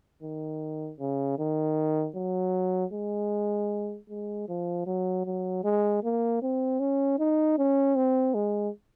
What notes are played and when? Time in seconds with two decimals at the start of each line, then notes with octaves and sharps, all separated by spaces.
0.23 D#3
1.00 C#3
1.39 D#3
2.16 F#3
2.93 G#3
4.09 G#3
4.48 F3
4.87 F#3
5.26 F#3
5.64 G#3
6.03 A#3
6.42 C4
6.80 C#4
7.19 D#4
7.58 C#4
7.96 C4
8.35 G#3